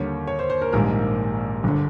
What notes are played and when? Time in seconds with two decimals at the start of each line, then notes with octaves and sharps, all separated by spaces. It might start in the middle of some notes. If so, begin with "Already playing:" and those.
Already playing: D#2 D3 G3 A#3 C#5
0.27 C#5
0.39 C5
0.50 C5
0.61 A#4
0.73 A#1 G#2 D#3 G3 A#3 A#4
1.64 G1 D3